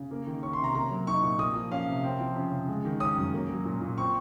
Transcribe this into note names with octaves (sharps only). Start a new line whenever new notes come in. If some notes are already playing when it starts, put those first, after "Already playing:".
Already playing: C#3
A#3
D#3
C#4 C#6
C6
C3 A#5
A#3 A#5
F#3
D#4 C#6
A#2
A#3 D#6
F3
C#4 F5
C3
C4
F3
C#3
C#3
G#3
D#3
C#4 D#6
F#2
A#3
F#3
A#2
A#2
C4 C#6